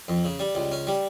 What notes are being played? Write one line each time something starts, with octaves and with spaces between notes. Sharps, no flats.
F2
C#3
G3
C#2
C#4
G3